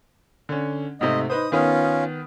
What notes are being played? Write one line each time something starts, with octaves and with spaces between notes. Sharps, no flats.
D3 C#4
G#2 C3 A3 D#5
D#4 B4 C5 D#6
D#3 B3 C#4 F4 D#6